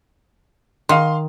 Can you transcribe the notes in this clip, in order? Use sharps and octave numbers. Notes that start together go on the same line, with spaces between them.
D#3 F5 C6